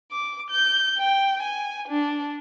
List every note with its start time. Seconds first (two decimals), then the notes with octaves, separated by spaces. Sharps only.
0.12 D6
0.50 G6
0.97 G5
1.41 G#5
1.88 D4